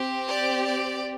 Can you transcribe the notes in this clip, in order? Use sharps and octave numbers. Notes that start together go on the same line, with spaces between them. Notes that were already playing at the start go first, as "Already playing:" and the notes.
Already playing: C4 G4
D5
D5